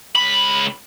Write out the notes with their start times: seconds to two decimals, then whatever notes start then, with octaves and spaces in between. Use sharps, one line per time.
0.16 C#2 B5